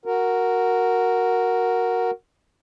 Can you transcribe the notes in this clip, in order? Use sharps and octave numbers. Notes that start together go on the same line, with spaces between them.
F#4 A#4